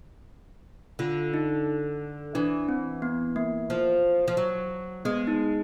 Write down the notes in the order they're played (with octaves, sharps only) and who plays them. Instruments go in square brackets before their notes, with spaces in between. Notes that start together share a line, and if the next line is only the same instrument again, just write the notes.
[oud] D3 [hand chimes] F4
[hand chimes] D#4
[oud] E3 [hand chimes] D4
[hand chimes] C4
B3
A#3
[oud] F3
F3
F#3
[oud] G#3 [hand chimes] B3
[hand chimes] D#4